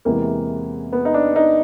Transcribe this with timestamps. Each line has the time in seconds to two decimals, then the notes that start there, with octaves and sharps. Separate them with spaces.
0.05 E2 C3 E3 G#3 A#3
0.92 B3
1.05 D#4
1.14 D4
1.36 D#4